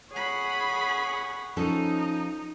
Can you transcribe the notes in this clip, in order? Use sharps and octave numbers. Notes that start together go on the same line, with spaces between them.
G#4 C#5 F#5 B5
F3 C#4 D#4 A4